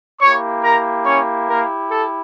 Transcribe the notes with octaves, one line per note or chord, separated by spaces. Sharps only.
A#3 E4 G4 C#5 C#6
A#4 A#5
C#4 C#5
A#3 A#4
A4